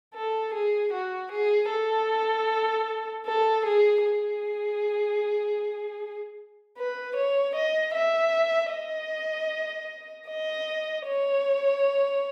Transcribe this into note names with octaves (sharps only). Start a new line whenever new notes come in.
A4
G#4
F#4
G#4
A4
A4
G#4
G#4
B4
C#5
D#5
E5
D#5
D#5
C#5